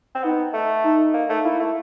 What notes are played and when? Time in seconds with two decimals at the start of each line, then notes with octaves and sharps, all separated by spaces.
0.15 C4
0.23 B3 D#4
0.54 A3
0.84 D#4
1.14 A#3
1.30 A3
1.44 A#3 E4
1.60 A3